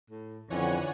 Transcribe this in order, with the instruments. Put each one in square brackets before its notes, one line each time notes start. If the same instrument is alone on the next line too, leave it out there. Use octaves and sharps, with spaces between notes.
[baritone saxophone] A2
[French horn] F2 [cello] D3 C#4 [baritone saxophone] E3 [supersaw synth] C#5 F#5 G#5